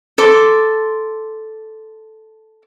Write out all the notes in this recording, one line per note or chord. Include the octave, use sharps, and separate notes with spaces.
A4 C6 D6